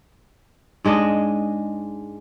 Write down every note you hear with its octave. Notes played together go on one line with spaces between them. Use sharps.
G#2 G#3 D4 D#5